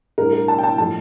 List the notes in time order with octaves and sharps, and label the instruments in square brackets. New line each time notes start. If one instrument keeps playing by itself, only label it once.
[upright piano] A2 G3 D4 A#4
A#4
A5
G5
A5
A2 F3 A3 A5